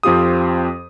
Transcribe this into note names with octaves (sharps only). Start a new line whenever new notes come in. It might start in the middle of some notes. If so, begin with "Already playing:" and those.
F2 C4 F4 G4 D#6